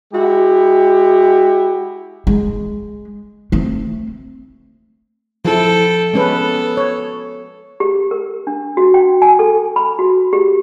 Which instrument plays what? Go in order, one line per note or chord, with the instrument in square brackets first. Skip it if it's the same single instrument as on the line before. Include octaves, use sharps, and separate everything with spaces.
[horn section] G#3 E4 F#4 G4
[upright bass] G#3
A3 C4
[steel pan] F3 E4 [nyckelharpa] A4 G5
[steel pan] G#3 C#4 B4 [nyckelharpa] B3 A4
[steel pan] C#5
[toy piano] G4
A#4
D4
F#4
G5
G#5
A4
B5
F#4
G4